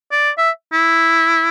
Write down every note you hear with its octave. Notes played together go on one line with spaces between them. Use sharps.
D5
E5
E4